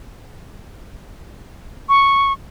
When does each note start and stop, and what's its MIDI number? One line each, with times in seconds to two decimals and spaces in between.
1.89 2.33 85